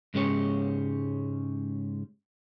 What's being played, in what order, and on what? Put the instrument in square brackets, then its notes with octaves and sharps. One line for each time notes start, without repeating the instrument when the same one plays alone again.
[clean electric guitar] G#2 C#3 G#3 C#4 G4 C#5